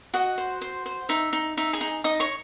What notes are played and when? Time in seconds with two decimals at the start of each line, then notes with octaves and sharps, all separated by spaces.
0.14 F#4 D#5 F#5
0.38 C5
0.61 C5
0.86 C5
1.09 D#4 E5
1.33 D#4
1.57 D#4 E5
1.73 G#4 G#5
1.81 D#4
2.04 D#4 D#5 D#6
2.20 C#5 C#6